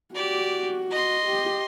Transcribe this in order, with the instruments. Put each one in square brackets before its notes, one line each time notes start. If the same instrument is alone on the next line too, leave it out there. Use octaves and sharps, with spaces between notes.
[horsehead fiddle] F#4 [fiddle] G4 D5
[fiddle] D#5 C6
[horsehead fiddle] G4